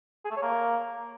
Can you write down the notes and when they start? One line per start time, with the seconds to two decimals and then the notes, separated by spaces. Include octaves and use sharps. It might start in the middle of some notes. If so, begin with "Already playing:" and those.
0.25 G#4
0.30 A3
0.36 C#5
0.42 A#3